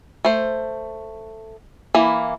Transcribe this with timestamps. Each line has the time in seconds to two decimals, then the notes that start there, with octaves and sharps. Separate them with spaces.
0.25 A3 C5
1.95 E3 A#3 B5